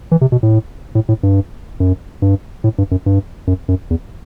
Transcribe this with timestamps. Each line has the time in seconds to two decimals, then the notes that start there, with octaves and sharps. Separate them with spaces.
0.11 E3
0.21 C3
0.32 B2
0.43 A2
0.95 A2
1.09 A2
1.23 G2
1.80 F#2
2.22 G2
2.64 A2
2.78 G2
2.91 F#2
3.06 G2
3.47 F#2
3.68 F#2
3.90 E2